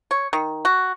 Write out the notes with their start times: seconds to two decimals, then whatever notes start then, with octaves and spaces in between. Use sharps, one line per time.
0.11 C#5
0.33 D#3
0.65 F#4